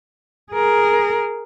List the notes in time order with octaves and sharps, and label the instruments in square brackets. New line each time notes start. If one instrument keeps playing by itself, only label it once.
[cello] G#4 A#4